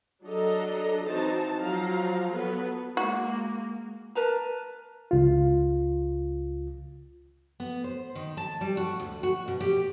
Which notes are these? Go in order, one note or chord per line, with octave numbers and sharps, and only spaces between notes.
F#3 D4 A4 D#5 A#5
E3 C4 D#4 F#4 A5 A#5
F3 F#3 F5 A#5
F#3 B3 A4 B4
G#3 A#3 F#4
A#4 B4 A5 A#5
C#2 F4
B3
C5
D#3
A5
G3
F#4
D2
F#4
B2
G4